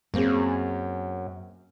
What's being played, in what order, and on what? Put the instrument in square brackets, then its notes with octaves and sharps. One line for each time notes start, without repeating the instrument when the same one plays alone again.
[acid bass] F#2 [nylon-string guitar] A#3 C4 G#4